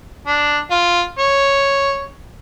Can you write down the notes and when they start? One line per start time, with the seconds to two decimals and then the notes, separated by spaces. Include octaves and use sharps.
0.27 D4
0.71 F4
1.19 C#5